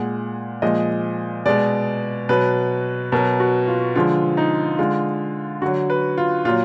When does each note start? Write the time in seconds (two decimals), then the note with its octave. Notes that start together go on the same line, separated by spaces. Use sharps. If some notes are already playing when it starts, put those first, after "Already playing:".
Already playing: A#2 G#3 F#5
0.62 A#2 F3 G#3 D#5
1.45 B2 G#3 D5
2.29 B2 F#3 B4
3.12 B2 F#3 A#4
3.40 F#4
3.68 F4
3.95 D3 F3 G#3 F4
4.37 D#4
4.78 D3 G#3 F4
5.62 D3 F#4
5.66 F#3
5.90 B4
6.18 F4
6.45 A#2 F4
6.49 F#3